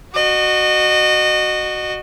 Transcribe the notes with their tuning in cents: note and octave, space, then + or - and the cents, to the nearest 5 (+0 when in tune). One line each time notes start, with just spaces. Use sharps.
F#4 +0 D#5 -30